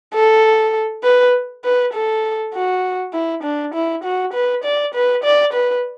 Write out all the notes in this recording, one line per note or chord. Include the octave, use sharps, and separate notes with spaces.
A4
B4
B4
A4
F#4
E4
D4
E4
F#4
B4
D5
B4
D5
B4